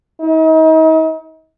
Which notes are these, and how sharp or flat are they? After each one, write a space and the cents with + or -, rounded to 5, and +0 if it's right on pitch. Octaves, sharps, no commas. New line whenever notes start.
D#4 +40